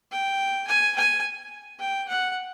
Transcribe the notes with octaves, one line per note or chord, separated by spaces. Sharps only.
G5
G#5
G#5
G5
F#5